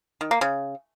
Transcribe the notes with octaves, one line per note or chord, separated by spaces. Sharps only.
D#3
A#3
C#3